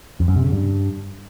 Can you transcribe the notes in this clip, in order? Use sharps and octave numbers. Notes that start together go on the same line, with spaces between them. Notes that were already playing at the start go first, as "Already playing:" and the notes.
F2
F#2
C3
C#3
G2